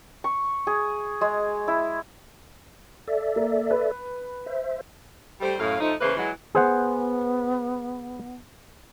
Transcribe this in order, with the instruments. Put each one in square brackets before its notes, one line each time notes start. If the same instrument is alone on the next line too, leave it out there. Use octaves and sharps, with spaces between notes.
[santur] C#6
G#4
G#3
E4
[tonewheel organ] A4 D5 E5
[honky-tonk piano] A#3
B4
[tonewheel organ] C5 E5
[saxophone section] G3 A3 C5
F#2 A2 F5
F3 A3 D#4
E2 C#3 E3 A#3 B4 C5
E3 F#3 G#3
[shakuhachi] B3 [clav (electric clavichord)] G#4 C5 F#5